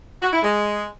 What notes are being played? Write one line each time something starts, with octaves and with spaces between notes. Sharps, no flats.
F#4
E4
G#3